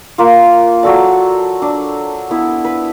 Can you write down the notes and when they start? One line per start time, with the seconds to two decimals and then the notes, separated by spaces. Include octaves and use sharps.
0.18 A#3 F4
0.83 F#3 F#4 A4 D5
1.62 D4
2.31 B3 E4
2.65 B4